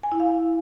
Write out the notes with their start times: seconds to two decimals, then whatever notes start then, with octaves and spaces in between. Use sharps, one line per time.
0.03 G#5
0.12 E4
0.20 F5